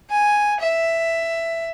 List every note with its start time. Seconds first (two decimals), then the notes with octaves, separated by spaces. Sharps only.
0.10 G#5
0.60 E5